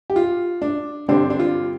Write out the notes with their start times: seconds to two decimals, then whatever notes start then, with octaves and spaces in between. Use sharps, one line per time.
0.10 G4
0.16 F4
0.62 D4
1.08 G2 D3 G3 C4 D4
1.30 D4
1.39 F4